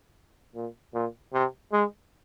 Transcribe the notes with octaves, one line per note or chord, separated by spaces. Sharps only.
A#2
A#2
C3
G#3